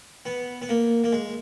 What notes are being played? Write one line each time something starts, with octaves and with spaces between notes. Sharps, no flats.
B3
B3
A#3
A#3
G#3